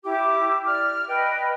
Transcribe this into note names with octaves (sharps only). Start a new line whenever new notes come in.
E4 G4 D6
D5 F6
B4 D#5 G5